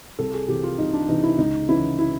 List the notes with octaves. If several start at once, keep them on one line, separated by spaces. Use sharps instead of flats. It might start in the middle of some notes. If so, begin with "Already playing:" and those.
C2 A4
G#4
C3 E3 G4
F4
C2 D#4
D4
C3 E3 D#4
E4
C#2 D#4
C#3 E3 E4
E4